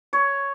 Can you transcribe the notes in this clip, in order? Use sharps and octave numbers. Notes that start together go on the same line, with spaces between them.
C#5